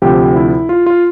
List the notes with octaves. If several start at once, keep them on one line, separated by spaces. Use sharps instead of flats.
D2 C3 F3 G4
E4
F4
F4